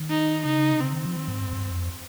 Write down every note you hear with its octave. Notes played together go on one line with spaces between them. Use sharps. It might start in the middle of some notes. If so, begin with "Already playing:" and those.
Already playing: D#3
D#4
C#3 D#4
C3
C#3 C4
D#3
F3
D#3
G#2
G2
F2
G2
F2